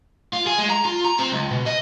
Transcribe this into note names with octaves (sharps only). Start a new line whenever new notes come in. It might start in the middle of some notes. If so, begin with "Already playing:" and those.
F4
G#4
G#3
A#5
F4
A#5
C4
C#2
B2
D#5